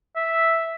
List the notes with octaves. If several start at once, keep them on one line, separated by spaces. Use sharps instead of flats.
E5